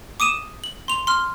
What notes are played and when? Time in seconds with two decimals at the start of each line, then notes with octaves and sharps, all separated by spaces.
0.20 D6 D#6 D#7 E7
0.64 F#7
0.88 C6 F7
1.07 C6 F6